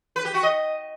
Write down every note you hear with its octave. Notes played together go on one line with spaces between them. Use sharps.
B4
G4
F#4
D#5